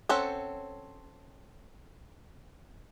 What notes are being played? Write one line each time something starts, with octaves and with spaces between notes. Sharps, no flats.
C4 C#4 A4 C5 F#5